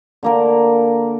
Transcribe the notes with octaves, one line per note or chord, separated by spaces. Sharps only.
D3 A#3 A#4